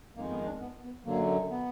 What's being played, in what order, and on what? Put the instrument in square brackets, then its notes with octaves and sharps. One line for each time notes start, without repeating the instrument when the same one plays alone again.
[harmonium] F2 D#3 G#3 A#3
B3
D4
B3
B3
F#2 D3 F#3 A#3
B3